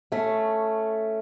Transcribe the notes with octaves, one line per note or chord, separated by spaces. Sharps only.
A3 C#4